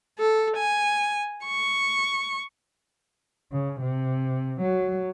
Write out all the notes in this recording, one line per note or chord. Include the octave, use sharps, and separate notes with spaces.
A4
G#5
C#6
C#3
C3
F#3